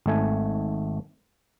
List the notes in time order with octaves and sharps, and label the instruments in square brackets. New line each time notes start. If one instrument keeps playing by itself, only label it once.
[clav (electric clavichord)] G#1 A3 G#5